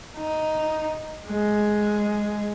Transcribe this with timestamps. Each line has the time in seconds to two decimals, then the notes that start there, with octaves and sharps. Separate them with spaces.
0.18 D#4
1.29 G#3